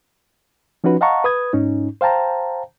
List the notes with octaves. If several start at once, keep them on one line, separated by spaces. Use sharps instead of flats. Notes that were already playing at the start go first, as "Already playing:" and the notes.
F3 C#4 D#4 F#4 B4
D#5 F5 F#5 A5 A#5 C#6
B4 D#6 G#6
G#2 C#4 D#4
C5 F5 G5 A5 A#5